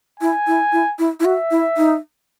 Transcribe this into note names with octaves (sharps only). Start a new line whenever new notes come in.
E4 G#5
E4
E4
E4
E4
F#4 E5
E4
D#4